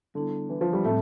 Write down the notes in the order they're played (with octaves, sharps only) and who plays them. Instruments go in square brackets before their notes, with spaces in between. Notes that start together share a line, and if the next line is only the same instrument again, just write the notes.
[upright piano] D3 [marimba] G3 B3 E4
[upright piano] E3
F3
G3
[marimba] A2 G3 C4 [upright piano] A3